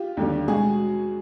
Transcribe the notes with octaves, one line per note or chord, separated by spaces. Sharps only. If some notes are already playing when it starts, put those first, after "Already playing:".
Already playing: F4 G4
D#2 D3 G3
B2 G#3 F#4 G#4